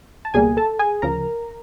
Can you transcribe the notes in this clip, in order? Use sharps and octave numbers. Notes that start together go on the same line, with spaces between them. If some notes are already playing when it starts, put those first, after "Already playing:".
A5
C#2 B2 G3 A#3 G#4 G#5
A4 A5
G#4 G#5
D2 C#3 F3 A#4 A#5